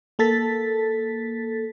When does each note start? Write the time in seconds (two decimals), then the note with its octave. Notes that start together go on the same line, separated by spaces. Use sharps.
0.19 A#3 A4 A6 B6